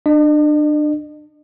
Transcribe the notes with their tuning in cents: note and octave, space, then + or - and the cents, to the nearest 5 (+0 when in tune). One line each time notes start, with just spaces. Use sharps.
D4 +30 D#5 -40